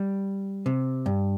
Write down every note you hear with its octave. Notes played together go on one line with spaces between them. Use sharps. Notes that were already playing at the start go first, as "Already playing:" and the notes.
Already playing: G3
C3
G2